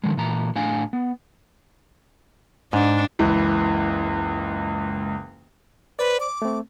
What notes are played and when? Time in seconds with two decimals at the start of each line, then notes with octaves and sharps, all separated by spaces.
0.04 D3 D#3 F3 G#3
0.17 A#2 E3 A#5
0.56 A2 D4 F5 G#5
0.93 B3
2.73 G#2 D4
3.19 F#1 C#2 E3
5.99 B4 C5 D5
6.20 D6
6.42 A3 C4